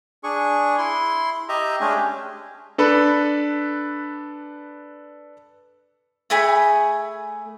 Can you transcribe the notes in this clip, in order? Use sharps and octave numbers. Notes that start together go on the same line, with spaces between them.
D4 G#4 C#6
E4 C6
G4 D#5 E5 A#5
G#3 A3 C#4 D4 G4 G#4
D4 A4 B4 B5
A3 G#4 G#5 B5